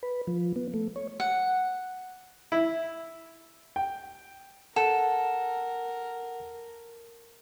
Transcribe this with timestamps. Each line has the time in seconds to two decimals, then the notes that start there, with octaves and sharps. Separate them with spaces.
0.03 B4
0.27 F3
0.56 B3
0.74 A3
0.96 C#5
1.20 F#5
2.52 E4
3.76 G5
4.76 A4 A#4 F#5